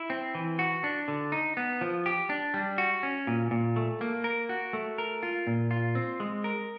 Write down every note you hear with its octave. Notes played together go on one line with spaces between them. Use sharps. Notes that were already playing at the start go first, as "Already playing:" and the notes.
Already playing: E4
C4
E3
F#4
D4
D3
D#4
B3
F3
G4
D4
G3
F#4
C#4
A#2
A#2
A3
A#3
A#4
F#4
A3
A#4
F4
A#2
F4
C4
G#3
A#4